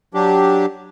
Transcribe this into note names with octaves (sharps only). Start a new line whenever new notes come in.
F#3 D4 G4